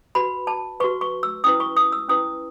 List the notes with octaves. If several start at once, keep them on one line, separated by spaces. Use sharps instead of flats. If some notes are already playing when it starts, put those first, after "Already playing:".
F#4 B4 B5
A5
F#4 B4 C#6
C#6
E6
C#4 E4 B4 D#6
C#6
D#6
E6
C#4 E4 B4 D#6